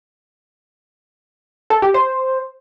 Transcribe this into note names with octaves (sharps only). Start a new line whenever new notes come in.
A4
G4
C5